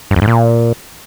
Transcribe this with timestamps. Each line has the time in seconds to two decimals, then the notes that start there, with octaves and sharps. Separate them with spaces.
0.11 G2
0.16 F2
0.22 G#2
0.27 A#2